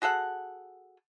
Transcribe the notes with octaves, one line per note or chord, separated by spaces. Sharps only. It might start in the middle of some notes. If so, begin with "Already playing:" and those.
F#4 G#4 A4 F#5